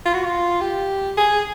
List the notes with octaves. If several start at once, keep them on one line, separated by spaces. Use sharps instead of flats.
F4
F#4
F4
G4
G#4